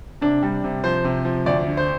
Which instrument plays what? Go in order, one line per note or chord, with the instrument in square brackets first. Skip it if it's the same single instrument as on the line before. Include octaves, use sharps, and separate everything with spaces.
[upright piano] C3 [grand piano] D4
[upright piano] G3
C3
[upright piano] F3 [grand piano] C5
[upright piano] C3
F3
[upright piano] D2 [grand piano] D5
[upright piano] D3
[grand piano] C5